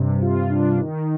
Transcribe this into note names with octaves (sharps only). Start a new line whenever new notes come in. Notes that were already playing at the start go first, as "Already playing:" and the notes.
Already playing: G2 C3
F4
D4
D#3